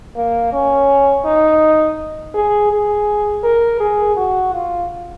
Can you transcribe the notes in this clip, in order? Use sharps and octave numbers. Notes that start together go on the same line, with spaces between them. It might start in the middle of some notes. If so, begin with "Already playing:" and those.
A#3
C#4
D#4
G#4
G#4
A#4
G#4
F#4
F4